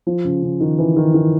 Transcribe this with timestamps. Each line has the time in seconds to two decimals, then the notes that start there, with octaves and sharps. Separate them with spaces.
0.07 F3
0.25 C#3
0.43 C#3
0.60 D#3
0.78 E3
0.97 D#3
1.14 D#3